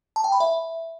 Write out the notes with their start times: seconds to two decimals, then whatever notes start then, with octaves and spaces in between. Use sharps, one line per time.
0.16 A5
0.24 G5
0.32 B5
0.40 E5